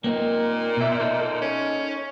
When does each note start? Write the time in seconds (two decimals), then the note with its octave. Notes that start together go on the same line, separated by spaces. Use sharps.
0.04 A#2 A#3 C4 D#4
0.77 B2 E5
1.00 D#4 A4 C5
1.42 C#4